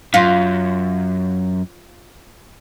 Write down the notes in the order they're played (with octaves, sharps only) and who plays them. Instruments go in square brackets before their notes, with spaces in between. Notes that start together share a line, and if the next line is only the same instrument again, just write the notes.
[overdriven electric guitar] F#2 [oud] F4